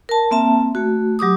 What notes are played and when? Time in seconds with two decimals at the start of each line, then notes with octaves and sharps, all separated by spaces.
0.09 A#4 A5
0.31 A#3 C4 E5 A5
0.75 A3 F#4
1.19 F#3 G4 D6 D#6